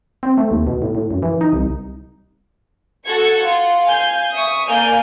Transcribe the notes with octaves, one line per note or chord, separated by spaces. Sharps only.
C4
A3
D#2
B2
A2
A2
F#2
E3
D#4
C2
F#4 A4 F#5 G#6 C#7
F4 F#5
F5 G#5 G6
E5 C#6 D#6
A#3 D5 G#5 F6 G6 D7